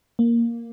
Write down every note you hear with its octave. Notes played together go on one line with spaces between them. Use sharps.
A#3